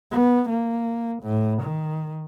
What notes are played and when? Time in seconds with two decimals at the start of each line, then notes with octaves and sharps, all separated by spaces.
0.12 B3
0.50 A#3
1.23 A2
1.63 D#3